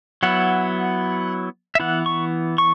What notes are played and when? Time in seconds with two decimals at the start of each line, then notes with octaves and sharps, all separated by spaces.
0.23 F#3 B3 E4 F#5
1.75 E5
1.80 E3 B3 E4 F#5
2.06 C#6
2.58 C#6